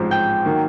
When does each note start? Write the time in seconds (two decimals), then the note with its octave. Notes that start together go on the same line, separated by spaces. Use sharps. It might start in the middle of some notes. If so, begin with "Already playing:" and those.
Already playing: A1 G#2 F3 G#3 C4
0.11 G5
0.45 D#3 F#3 A#3